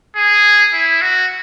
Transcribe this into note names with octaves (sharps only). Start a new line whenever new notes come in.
G#4
E4
F#4